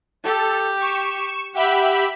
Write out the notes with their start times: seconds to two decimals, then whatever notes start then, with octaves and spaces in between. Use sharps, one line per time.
0.24 G4 A4
0.80 C#6 E7
1.55 G4 E5 F#5 B5